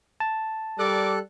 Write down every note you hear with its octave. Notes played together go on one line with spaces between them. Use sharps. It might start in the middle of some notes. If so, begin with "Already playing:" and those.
A5
G3 A4 A#4 D5 D6 F#6